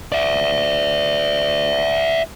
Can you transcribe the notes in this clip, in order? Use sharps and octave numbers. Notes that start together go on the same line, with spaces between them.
D5 E5